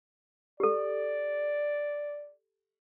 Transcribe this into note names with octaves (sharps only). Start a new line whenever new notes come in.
G4 A4 D5